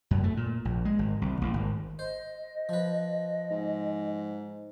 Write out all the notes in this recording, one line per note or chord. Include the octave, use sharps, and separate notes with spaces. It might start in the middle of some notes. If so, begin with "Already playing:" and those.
F#2
A3
A#2
A#1
G#3
G#1
C2
A1
G#1
C5 D#5
F3 B4
G#2